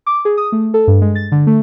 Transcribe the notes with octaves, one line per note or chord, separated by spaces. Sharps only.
D6
G#4
D#6
A3
A4
G2
G#3
A6
D3
A3